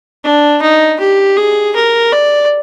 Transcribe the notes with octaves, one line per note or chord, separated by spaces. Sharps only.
D4
D#4
G4
G#4
A#4
D5